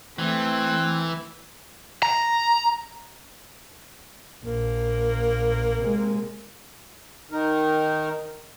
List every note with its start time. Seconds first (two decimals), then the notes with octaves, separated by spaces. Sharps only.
0.19 E3 A3 C4
2.03 A#5
4.44 A#1 A#3
5.80 C3 G#3
7.31 D#3 D#4 A#4